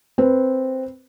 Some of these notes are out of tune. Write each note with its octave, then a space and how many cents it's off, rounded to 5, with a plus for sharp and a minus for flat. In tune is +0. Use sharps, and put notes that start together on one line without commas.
C4 +0 B4 +0